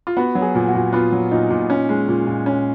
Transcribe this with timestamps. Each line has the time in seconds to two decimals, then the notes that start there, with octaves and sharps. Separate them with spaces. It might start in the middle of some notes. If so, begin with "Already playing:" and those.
0.07 F4
0.17 B3 F#4
0.35 F#3
0.42 G#4
0.55 A#2
0.68 F#4
0.74 A#2
0.93 B3 F4
1.12 F#3
1.31 A#2 D#4
1.50 A#2
1.70 C#4
1.89 G#3
2.08 A#2
2.27 A#2
2.46 C#4